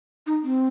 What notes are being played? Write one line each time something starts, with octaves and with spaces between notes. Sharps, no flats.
D#4
C4